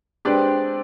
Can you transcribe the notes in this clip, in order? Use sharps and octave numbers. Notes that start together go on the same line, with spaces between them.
G#3 C4 D4 G4 B4 D5